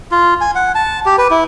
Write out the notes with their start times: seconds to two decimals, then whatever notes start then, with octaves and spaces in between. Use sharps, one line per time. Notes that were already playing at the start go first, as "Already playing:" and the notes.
0.12 F4
0.41 G#5
0.55 F#5
0.75 A5
1.06 G4
1.18 B4
1.31 E4